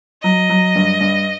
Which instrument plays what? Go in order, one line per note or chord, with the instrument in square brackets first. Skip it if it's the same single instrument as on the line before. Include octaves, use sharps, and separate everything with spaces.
[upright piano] F#3 [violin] D#5
[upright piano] F#3
G2
G2